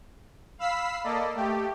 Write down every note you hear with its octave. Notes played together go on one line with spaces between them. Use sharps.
F5 B5 E6 B6 C7
A#3 A4 D5 D#5
A3 G4